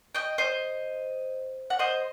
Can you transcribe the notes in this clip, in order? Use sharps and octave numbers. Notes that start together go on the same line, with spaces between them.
D#5 G5
C5 D#5
F#5
C5 D#5